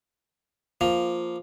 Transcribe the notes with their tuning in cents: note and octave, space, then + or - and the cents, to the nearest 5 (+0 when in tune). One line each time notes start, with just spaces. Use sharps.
F3 +0 A#3 +0